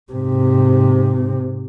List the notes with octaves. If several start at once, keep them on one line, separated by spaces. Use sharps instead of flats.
G#2 C3